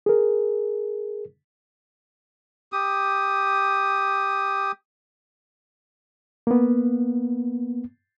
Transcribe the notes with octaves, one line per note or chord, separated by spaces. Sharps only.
G#4 A#4
G4 D#6
A#3 B3